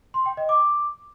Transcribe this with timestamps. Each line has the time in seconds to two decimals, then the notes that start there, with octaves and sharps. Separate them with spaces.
0.14 C6
0.26 G5
0.37 D#5
0.49 D6